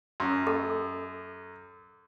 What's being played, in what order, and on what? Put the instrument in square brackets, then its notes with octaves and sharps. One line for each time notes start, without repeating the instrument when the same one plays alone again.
[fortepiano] F#2
[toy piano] A4